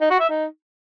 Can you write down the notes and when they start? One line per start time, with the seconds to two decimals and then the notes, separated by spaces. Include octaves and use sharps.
0.01 D#4
0.11 F#4
0.20 E5
0.29 D#4